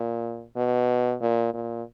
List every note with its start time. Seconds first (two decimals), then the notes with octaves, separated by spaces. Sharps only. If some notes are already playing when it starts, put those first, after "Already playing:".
Already playing: A#2
0.57 B2
1.21 A#2
1.54 A#2